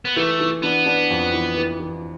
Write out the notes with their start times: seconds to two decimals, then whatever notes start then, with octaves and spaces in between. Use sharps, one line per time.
0.05 B3
0.16 E3 A3
0.40 E3
0.63 B3 D4
0.86 D4
1.10 F2
1.33 E3
1.57 E3
1.80 E3